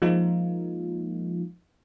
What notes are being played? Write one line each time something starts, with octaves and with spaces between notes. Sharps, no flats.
F3 G#3 A#3 D#4 F4